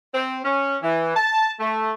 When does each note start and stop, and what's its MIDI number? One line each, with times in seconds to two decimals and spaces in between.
0.14 0.39 60
0.45 0.76 61
0.82 1.15 52
1.16 1.51 81
1.60 1.92 57